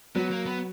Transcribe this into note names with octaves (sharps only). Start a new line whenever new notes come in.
F#3 B3
A#3
B3